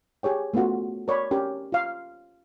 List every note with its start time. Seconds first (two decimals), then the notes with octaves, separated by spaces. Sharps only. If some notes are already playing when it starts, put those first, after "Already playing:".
0.23 G4 G#4 C#5 G5
0.54 A3 B3 C#4 F4 F#4
1.08 A#4 C#5 D5 B5
1.31 C#4 G4 A#4
1.72 F4 F5